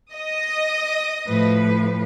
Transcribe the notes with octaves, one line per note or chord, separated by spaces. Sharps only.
D#5 D#6 A#6
A2 F3 B4